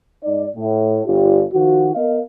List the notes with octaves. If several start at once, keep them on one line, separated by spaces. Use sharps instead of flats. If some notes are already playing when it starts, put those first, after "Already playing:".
G#2 D#4 D5
A2
G1 D4 F4 G4
D#3 F3 F#4
B3 A#4 D#5 F5